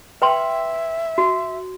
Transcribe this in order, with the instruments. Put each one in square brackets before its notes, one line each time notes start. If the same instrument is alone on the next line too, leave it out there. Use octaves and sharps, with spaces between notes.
[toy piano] B4 G5 C6 [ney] E5
[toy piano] F#4